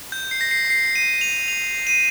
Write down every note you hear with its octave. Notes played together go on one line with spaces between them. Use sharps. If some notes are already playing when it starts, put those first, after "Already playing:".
G6
C7
A#6
C7
C7
D#7
F7
F7
D#7